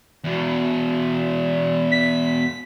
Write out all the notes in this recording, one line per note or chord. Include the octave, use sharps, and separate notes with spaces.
E2 B2
B6